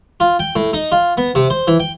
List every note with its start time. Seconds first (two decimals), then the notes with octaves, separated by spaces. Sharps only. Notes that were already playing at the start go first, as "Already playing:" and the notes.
0.20 F4
0.39 G5
0.56 A2
0.73 D#4
0.92 F4
1.17 B3
1.35 C3
1.50 C5
1.68 E3
1.80 G5